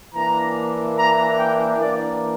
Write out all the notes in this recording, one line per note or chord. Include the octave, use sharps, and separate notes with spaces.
E3 A#3 D4 A#5
A#5
G5
E3 A#3 D4 D5